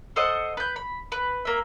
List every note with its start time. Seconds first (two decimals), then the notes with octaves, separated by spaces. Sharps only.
0.16 A4 C5 D#5 F#5
0.57 B4 G6
0.76 B5
1.12 B4
1.45 A#3 E5